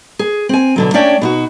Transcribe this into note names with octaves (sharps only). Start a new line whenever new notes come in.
G#4
C4 G#5
B2 D3 F#3
A3 C#4 D4 C#5 D5 G5
B2 D#4 F#4